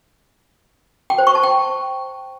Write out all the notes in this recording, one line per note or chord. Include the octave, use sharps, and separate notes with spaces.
G5
C5
C#6
A5
G5